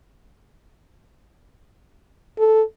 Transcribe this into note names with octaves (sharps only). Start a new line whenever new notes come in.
A4